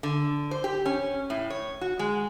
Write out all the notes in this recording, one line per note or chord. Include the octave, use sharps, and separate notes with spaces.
D3
C5
G4
C#4
A2
C#5
F#4
G#3